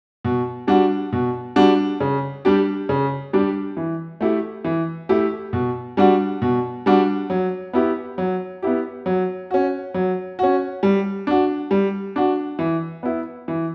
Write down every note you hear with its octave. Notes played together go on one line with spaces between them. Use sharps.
B2
G3 D4 F#4
B2
G3 D4 F#4
C#3
G3 D4 G4
C#3
G3 D4 G4
E3
A3 E4 G4
E3
A3 E4 G4
B2
G3 D4 F#4
B2
G3 D4 F#4
F#3
B3 E4 G4
F#3
B3 E4 G4
F#3
C#4 F#4
F#3
C#4 F#4
G3
D4 F#4
G3
D4 F#4
E3
B3 E4
E3